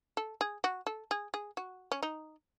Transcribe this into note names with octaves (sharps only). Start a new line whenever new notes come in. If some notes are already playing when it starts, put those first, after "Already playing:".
A4
G#4
F#4
A4
G#4
G#4
F#4
C#4
D#4